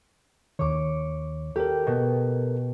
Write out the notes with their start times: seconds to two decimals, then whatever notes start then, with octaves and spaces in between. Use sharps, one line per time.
0.59 D#2 D#3 C#5 D6
1.56 G4 A4 A#4
1.87 B2